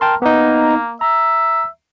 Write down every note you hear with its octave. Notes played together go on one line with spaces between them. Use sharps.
A#4 G5 A5 C6
A#3 B3 D#4
E5 A#5